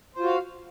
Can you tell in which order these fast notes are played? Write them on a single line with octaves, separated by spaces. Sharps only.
C5 F4 F#4 F5